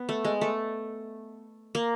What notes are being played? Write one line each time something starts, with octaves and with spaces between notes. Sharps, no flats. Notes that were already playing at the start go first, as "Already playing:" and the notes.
Already playing: B3
A3
G#3
A3
A#3